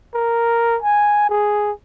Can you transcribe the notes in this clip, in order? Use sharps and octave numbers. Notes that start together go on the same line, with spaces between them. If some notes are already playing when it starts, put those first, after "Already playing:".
A#4
G#5
G#4